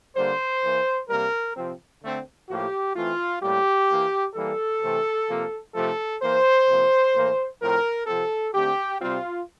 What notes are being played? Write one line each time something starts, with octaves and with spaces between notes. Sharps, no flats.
D3 G3 A#3 C5
E3 A#3
C3 G3 A#3 A#4
C3 F3 C4
D3 A3 C4
A2 F3 A#3 G4
E3 A3 C4 F4
A2 G3 A#3 G4
E3 A#3
E3 G3 A#3 A4
C3 E3 A3 C4
C3 F3 A#3
C3 F3 A3 C4 A4
E3 A#3 C5
C3 F3 A#3
A2 E3 A#3
A2 F3 C4 A#4
C3 F3 C4 A4
D3 A3 C4 G4
C3 G3 C4 F4